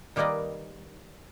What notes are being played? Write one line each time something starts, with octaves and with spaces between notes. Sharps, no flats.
D#3 G3 A#3 B4 D5 D#5